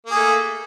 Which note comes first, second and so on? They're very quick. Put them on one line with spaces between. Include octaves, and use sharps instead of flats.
A#3 G#4 A3